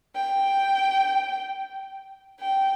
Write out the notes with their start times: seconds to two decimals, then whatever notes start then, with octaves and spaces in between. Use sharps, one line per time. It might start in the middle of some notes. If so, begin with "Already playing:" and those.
0.15 G5
2.40 G5